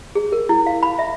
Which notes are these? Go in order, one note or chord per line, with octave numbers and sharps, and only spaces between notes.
G#4
A#4
E4
F5
B5
E5